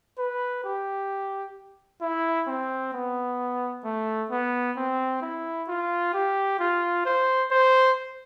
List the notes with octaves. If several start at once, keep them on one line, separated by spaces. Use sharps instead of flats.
B4
G4
E4
C4
B3
A3
B3
C4
E4
F4
G4
F4
C5
C5